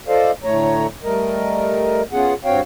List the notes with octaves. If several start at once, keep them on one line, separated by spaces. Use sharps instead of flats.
F4 A4 C5 D5 D#5 F5
D2 A2 A3 C#5 A#5
G3 A3 A#4 D#5
B3 C#4 F4 G#4 F#5
G2 C4 F#4 C#5 F5 G5